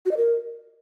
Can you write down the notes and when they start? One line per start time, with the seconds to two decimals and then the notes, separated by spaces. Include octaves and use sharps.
0.06 F#4
0.11 D#5
0.17 A#4